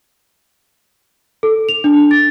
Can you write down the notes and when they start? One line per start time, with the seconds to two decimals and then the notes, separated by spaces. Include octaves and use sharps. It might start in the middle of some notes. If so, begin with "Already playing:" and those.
1.43 A4
1.69 F7
1.84 D4
2.11 A6